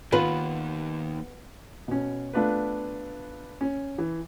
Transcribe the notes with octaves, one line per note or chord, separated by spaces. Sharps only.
D#2 D#3 B3 F4 B4
B2 C#4
A3 B3 D4 F4 B4
C#4
E3